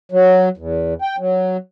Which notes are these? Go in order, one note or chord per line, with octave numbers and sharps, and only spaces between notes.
F#3
E2
G5
F#3